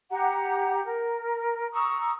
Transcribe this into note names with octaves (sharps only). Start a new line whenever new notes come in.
G4 F#5 A#5
A#4
A#5 C#6 D#6 E6